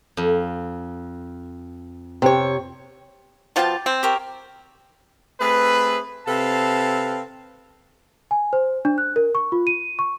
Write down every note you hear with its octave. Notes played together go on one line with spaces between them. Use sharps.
F2
C3 C#5
B2 F3 F4 D5 G5 A5
C4
G4 A#4 C#5
A3 C4 G#4 B4
C3 C4 A4 B4 F5 A5
G#5
C5
D4
F#6
A#4
C#6
F4
D#7
C#6